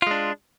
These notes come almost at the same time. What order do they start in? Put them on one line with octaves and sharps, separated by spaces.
F4 G#3 D4